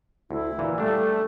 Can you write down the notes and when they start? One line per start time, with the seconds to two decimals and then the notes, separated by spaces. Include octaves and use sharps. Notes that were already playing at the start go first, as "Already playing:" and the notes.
0.31 D2 E4
0.59 A#2 E3
0.78 G3 A3 D4